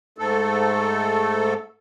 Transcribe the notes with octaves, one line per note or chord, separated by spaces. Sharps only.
G#2 A3 A4